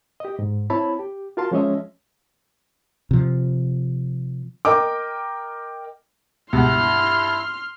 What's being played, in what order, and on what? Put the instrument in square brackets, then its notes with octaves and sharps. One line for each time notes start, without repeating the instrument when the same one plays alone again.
[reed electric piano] G4 D#5
G#2
C4 E4 C#5 A5 B5
G4
F4 F#4 A#4 F5 A5 C6
F3 G#3 C#4 C#5 D#5 E5
[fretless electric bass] C3 F3
[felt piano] A#4 D#5 G5 D6
[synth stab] C#2 B2 [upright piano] G2 F#5 [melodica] E4 [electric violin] C6 F6